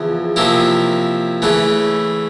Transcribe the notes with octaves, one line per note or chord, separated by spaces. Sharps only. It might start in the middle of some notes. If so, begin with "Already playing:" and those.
Already playing: E2 C#3 F3
C3 F3 A#3 C#4 E4
C#3 E3 A3 C#4